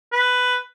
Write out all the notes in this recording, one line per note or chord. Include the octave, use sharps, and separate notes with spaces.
B4